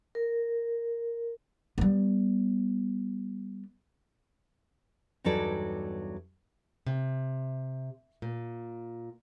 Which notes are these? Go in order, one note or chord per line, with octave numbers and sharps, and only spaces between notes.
A#4
G3 B3
E2 G2 F#3 D#4 A4 D5
C3
A#2